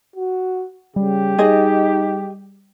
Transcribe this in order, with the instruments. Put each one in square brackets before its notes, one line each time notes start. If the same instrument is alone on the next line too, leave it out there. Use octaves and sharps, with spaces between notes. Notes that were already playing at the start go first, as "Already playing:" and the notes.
[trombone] F#4
[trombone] C#3 [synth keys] G3 [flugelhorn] G4
[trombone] D#4 [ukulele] G#4 D#5